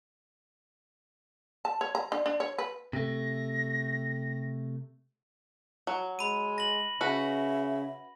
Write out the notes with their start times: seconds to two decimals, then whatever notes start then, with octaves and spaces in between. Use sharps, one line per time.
1.65 A5
1.81 C#5
1.95 A#5
2.12 D4
2.26 D4
2.40 C#5
2.58 B4
2.93 C3 A3 A#6
5.87 F#3
6.19 G#3 B5 D#7
6.58 A#6 F#7
7.01 C#3 F#4 B4 E5